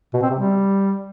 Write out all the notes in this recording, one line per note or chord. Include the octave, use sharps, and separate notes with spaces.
B2
C4
C3
G3